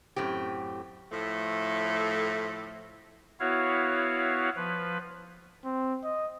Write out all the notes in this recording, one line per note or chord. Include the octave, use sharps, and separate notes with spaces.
F#2 A2 C4 G4
A2 F3 A3
B3 E4 F#4 C#5 F5
F3 B4
C4
D#5